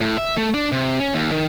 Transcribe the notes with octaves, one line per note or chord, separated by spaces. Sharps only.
A2
E5
A3
D4
C3
C#4
D#2
D#3